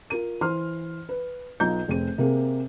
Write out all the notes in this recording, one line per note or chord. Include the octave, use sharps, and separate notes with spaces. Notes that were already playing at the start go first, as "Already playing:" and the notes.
F4 A#4 D#7
E3 C5 C6 F6
B4
B1 B2 F4 A#5 G6
F1 C4 G#4 D#7
C3 A#3 C4 G#4